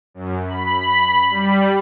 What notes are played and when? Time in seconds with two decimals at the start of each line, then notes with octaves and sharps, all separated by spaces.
0.14 F#2
0.46 B5
1.30 G3